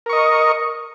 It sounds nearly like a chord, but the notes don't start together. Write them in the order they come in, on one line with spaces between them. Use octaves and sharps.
A#4 C#6 D#5